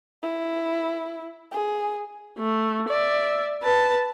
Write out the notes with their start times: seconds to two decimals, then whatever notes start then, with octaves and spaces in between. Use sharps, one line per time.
0.23 E4
1.52 G#4
2.38 A3
2.89 D5 E5
3.63 B4 A5